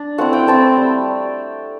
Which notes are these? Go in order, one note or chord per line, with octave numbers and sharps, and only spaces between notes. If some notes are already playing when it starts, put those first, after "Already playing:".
Already playing: D4
A3 C4 E4 F#5
G5
A3 C4 E4 A5
G3